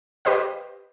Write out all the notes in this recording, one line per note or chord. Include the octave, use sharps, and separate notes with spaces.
G4 B4 C5 D#5 F5